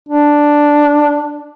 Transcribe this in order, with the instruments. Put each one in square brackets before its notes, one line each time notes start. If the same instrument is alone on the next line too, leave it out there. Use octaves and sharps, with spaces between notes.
[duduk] D4